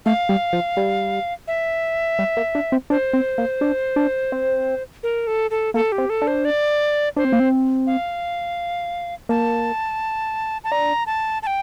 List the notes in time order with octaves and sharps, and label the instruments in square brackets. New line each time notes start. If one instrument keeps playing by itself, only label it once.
[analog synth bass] A3 [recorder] F5
[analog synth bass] G3
F3
G3
[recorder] E5
[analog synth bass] G3
A#3
D4
C4
[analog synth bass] D4 [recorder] C5
[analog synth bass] C4
A#3
D4
D4
C4
[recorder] A#4
A4
A4
[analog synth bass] A#3 [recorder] A4
[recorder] G4
[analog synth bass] C4
[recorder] A4
[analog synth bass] D4
[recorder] C5
D5
[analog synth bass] D4 [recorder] C5
[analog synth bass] C4
A#3
C4
[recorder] F5
[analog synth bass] A#3 [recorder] A5
[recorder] A5
[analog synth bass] D4 [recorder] A#5
[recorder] A5
A5
G5